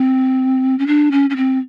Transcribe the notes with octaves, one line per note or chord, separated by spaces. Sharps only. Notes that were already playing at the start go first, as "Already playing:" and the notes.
Already playing: C4
C#4
D4
C#4
C#4
C4